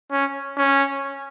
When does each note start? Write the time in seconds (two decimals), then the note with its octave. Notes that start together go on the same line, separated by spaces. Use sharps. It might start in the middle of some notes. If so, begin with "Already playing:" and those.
0.11 C#4
0.58 C#4